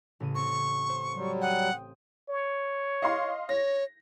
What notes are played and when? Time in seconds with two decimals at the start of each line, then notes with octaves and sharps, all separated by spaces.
0.20 A1 C#3 D#7
0.35 C4 C#6
0.89 C5
1.14 F#3 G3
1.41 F#5 G5 D#6
2.29 C#5
3.02 D#5 F5 C6
3.49 C#5 A#6